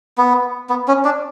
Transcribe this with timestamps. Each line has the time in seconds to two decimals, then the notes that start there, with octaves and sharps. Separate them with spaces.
0.18 B3
0.69 B3
0.88 C#4
1.05 D4